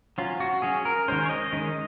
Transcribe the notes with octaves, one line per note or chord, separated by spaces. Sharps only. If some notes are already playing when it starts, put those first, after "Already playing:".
F#3 C#4 F4
F#4
F#3 C#4 G#4
A#4
D#3 G#3 C#4 C5
C#5
D#5
D#3 G#3 C#4